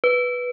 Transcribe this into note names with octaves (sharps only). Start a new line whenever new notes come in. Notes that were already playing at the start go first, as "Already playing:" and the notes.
B4